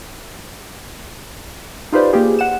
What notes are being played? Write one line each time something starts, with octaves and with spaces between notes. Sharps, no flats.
D#4 F4 G4 B4 C5 D5
A#3 F4 G4 G#4
F#5 E7